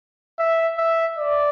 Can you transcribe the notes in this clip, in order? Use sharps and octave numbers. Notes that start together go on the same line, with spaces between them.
E5
E5
D5